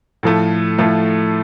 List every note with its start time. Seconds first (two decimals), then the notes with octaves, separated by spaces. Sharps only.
0.23 A2 F3 A3
0.78 A2 F3 A3